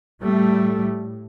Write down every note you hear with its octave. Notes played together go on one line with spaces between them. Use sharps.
A2 G3 A3